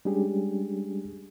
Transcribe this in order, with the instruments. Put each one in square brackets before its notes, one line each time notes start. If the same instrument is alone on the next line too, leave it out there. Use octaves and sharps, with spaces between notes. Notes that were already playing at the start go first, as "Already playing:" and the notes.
[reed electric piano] G3 G#3 C#4 D4 G4 G#4